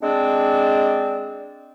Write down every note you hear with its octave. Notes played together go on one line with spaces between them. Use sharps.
G#3 C4 D4 D5